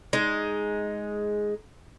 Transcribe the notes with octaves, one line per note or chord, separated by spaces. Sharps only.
G#3 D#4